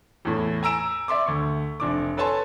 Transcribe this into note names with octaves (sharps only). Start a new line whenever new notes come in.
E2 A2
G#5 A#5 E6 D7 E7
D5 E5 C6 D6
D2 C#6
F1 D4 D6
A4 B4 C#5 G#5 A5 C6